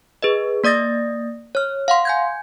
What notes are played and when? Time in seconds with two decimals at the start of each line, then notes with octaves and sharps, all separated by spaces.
0.22 G#4 B4 D#5
0.64 A#3 D5 D#6 A6 A#6
1.55 C#5 F6
1.88 F5 F#5 C6
2.05 G#5 G6 G#6